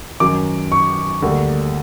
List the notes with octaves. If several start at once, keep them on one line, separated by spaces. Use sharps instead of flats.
F#2 D#3 F#3 D6
C#6
D2 D3 G3 A#3